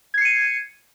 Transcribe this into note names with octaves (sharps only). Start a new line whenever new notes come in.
G#6 C7 C#7 D#7